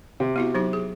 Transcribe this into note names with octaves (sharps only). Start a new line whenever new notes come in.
C3
B3 E4 F#4
F#3 D#4 G4
G#4